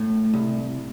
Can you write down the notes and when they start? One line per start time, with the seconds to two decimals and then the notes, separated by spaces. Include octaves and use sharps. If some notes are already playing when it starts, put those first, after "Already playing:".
Already playing: A2
0.34 C2